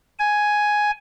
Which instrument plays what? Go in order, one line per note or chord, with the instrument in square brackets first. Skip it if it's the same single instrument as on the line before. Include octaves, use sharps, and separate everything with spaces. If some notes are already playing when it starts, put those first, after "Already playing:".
[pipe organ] G#5